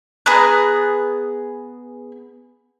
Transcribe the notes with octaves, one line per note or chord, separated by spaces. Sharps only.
B3 G#4 A#5 F#6